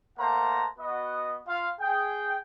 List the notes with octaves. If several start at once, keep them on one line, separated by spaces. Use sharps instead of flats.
A3 A#3 C5 F#5 A5 A#5
B3 F#4 D#5
F4 F5
G#4 G5